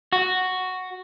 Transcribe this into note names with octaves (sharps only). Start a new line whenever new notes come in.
F#4